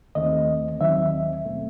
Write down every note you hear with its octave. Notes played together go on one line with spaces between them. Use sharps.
D#2 D#3 A3 C4 D#5
D#2 D#3 F#3 C4 E5
B2 A3 C4